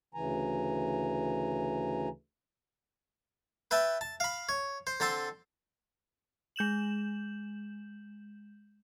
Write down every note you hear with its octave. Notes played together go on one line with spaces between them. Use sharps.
D2 C#3 E3 G#5 A#5
B4 E5 G5 A5
A5
F5 B5
C#5
C5
D3 C4 A4 A5 C6
G#3 G6 E7 F#7